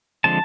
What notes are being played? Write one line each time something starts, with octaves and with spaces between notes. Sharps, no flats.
D3 F3 G#3 C4 A5